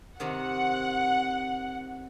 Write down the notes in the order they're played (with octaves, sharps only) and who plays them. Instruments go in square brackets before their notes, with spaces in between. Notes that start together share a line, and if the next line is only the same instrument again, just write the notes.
[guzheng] C3 D#3 [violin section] F#5